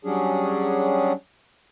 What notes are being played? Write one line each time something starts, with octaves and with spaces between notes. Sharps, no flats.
F#3 G3 C#4 D4 G#4